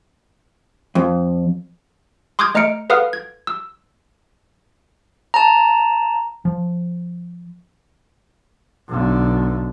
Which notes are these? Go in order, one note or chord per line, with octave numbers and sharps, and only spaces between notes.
F2
C6 D6 D#6 F6 G6 G#6
A3 D#5 A#5 F6 C#7 D7
A4 B4 F5 F#5 D#6 F6
G#6
E6
A5 A#5
F3
B1 D3